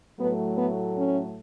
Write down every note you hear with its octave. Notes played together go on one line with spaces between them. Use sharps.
A2 F#3 A3 B3
B3
C#4